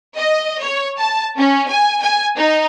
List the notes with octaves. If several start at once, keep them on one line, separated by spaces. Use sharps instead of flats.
D#5
C#5
A5
C#4
G#5
G#5
D#4